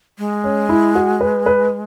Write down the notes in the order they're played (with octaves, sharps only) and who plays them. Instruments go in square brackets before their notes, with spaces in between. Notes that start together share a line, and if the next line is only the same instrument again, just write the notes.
[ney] G#3
[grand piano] C#4
E4
F#4
B4
B4